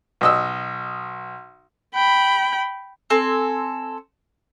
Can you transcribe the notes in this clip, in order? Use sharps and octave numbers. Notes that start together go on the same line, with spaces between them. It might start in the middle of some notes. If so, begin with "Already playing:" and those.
B1 D#5 E6
G5 B5
C4 A4 G#5